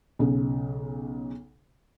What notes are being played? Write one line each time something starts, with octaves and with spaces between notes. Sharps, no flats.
B1 C#3